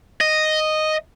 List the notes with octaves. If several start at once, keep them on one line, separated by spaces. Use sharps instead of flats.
D#5